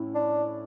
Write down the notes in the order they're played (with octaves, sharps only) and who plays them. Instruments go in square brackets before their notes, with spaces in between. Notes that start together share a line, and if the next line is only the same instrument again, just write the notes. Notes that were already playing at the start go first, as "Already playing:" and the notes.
Already playing: [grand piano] A2 C#4 E4
[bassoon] D4